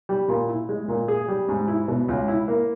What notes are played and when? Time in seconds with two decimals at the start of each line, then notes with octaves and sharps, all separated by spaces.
0.09 G3
0.28 A#2
0.49 E4
0.69 G#3
0.88 A#2
1.08 G#4
1.28 G3
1.49 G#2
1.68 E4
1.88 B2
2.08 C#2
2.28 E4
2.48 A#3